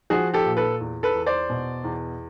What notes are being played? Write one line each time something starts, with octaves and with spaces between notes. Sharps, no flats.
F3 F#4 G#4
G4 A4
A#2
A4 B4
E2
A4 B4
E2
C5 D5
B2
E2